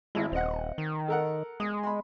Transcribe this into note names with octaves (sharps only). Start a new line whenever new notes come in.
G#1 G#3 E4
D#1 C4 D#5 F#5
D#3
A4 A#4 F#5
G#3 D#6
B5 C6